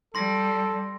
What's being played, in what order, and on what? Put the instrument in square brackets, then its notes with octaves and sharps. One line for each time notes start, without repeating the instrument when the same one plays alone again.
[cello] G3 [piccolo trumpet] A4 [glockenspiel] C6 A#6